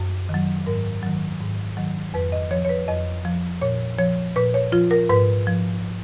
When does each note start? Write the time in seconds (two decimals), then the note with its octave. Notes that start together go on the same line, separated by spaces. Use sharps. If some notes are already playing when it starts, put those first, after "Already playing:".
Already playing: F#2
0.29 D#3 F#3
0.66 G#2 A#4
1.03 D#3 F#3
1.40 G#2
1.77 D#3 F#3
2.14 F2 B4
2.32 D#5
2.51 F3 C#5
2.65 C#5
2.69 B4
2.88 F2 D#5
3.25 F3
3.61 A#2 C#5
3.98 F3 C#5
4.36 A#2 B4
4.54 C#5
4.72 F3 F4
4.91 A#4
5.09 G#2 B4
5.47 F3